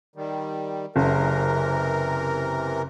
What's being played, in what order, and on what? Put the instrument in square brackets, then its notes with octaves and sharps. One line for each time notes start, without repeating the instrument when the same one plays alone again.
[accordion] D#3 G3
[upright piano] F#1 [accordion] C3 E3 A#4